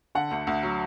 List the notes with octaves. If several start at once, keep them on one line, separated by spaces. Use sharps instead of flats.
D3 F#5
D2
D2
F#3